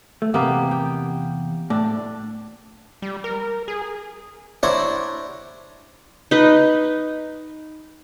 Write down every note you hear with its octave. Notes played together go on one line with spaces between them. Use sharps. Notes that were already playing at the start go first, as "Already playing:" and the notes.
A3
E2 C3 A#3 B3 G4
G5
A2 D4
G3
A#4
G#4
D4 E4 C5 C#5 F#5 A#5
D#4 B4